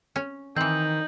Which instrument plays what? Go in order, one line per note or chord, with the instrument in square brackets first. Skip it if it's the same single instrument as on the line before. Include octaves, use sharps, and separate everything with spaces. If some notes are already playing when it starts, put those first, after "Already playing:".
[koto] C#4
[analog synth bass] D#3 [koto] E3 C4 [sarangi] D#4 [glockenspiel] G6 F#7